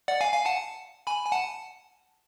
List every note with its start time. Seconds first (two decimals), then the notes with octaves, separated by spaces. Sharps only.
0.08 D5 F#5
0.21 F5 G#5
0.33 F5 G#5
0.45 F#5 A5
1.07 G#5 B5
1.27 G#5
1.32 F#5 A5